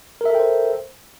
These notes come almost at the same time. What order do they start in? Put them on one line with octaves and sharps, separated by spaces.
A#4 E5 A4 G5 C5